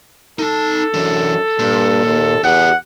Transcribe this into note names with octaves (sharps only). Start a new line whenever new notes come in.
D#4 A4 A5
F#2 E3 D4
G2 A#2
D#2
E2 G4 G#4 F#5